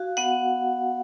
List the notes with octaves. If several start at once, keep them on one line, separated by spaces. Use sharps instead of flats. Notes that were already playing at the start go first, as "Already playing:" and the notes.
Already playing: F#4 F5
B3 F#5